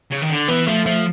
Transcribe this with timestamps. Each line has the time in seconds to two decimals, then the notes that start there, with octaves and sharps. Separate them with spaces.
0.11 C#3
0.22 D#3
0.30 D3
0.48 E3 B3
0.67 F3 A3
0.86 F3 A3